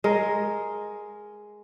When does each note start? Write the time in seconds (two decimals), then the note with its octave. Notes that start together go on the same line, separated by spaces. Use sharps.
0.04 G#3 A#4